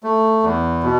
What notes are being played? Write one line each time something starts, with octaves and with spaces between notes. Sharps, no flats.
A3
E2
B2